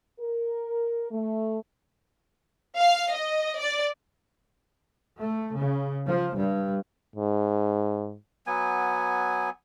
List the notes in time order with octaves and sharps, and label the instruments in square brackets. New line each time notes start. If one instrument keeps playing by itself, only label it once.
[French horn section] A#4
A3
[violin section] F5
D#5
D5
[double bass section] A3
C#3
F3
G2
[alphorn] G#2
[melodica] F#3 B3 G#5